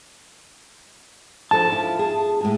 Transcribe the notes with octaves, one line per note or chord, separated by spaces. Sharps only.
F3 D4 A4 A5
E4 F4
G#4
A2 G#3 G#4